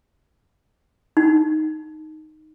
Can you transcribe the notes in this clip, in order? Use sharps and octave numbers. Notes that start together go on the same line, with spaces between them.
D#4